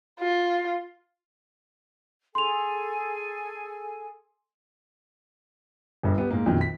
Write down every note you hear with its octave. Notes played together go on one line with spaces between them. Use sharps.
F4
G#4 A4 G#5 C6 F7
G1 G2
B3 G4
G#2 A#3
A#1 F2 B2 D#3
B6